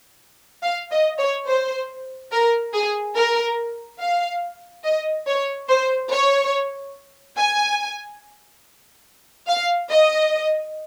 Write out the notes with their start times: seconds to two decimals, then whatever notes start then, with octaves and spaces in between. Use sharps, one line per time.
0.63 F5
0.91 D#5
1.19 C#5
1.47 C5
2.31 A#4
2.73 G#4
3.15 A#4
4.00 F5
4.84 D#5
5.26 C#5
5.68 C5
6.11 C#5
7.37 G#5
9.48 F5
9.90 D#5